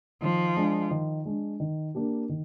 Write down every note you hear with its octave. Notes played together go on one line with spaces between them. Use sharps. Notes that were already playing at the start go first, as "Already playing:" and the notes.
D#3 F3
G#3 D4
D#3
G#3 D4
D#3
A#3 D4 G4
D#3